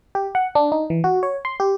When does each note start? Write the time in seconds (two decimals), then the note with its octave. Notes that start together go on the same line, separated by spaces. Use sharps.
0.15 G4
0.35 F#5
0.55 D4
0.72 D#4
0.90 E3
1.04 F#4
1.23 C#5
1.45 C6
1.60 G4